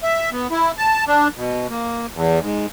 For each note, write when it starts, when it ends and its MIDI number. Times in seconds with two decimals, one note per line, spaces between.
0.03 0.30 76
0.32 0.47 59
0.51 0.72 64
0.78 1.04 81
1.07 1.28 62
1.36 1.67 47
1.69 2.07 58
2.13 2.39 40
2.40 2.66 44